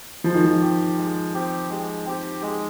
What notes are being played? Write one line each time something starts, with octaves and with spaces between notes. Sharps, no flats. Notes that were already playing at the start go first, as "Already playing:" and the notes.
F3 G#3
D#3
F3
C4 G4
G#3
C4 G4
G#3
C4 G4
G#3